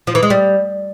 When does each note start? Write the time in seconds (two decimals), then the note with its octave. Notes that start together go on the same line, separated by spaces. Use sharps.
0.07 F3
0.15 E3
0.23 G#3
0.30 G3